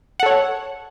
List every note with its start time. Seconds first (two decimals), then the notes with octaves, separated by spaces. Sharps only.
0.20 F#5
0.23 A4
0.26 C#5